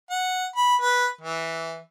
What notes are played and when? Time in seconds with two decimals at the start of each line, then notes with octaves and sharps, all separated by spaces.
0.11 F#5
0.56 B5
0.81 B4
1.21 E3